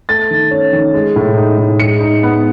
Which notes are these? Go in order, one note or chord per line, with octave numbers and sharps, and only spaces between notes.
A3 A6
D#3
C#4
D#3
G#3
A2
D#4
A2
G#3 C#7
D#4
B3